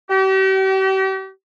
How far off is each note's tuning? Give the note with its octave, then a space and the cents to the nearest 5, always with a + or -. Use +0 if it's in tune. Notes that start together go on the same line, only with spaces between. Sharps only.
G4 -40